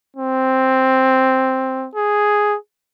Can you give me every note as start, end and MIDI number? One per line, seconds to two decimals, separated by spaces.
0.17 1.87 60
1.95 2.56 68